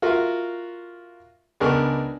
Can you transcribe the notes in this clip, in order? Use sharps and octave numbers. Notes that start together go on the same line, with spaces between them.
F4 F#4 A#4 E5
C#2 B3 D4 A#4 G#5 C#6